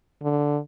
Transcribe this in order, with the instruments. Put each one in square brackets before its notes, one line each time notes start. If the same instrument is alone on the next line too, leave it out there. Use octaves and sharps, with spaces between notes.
[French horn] D3